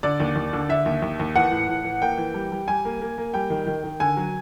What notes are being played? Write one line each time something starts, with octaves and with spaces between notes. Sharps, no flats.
D3 D5
D#2
D#2
D3
D3 E5
D#2
D#2
D#2
E3 F#5
A2
A2
E3
A#3 G5
E3
G3
G3
G3 G#5
A#3
A#3
A#3
G3 G5
D#3
D#3
D#3
D3 G#5
F#3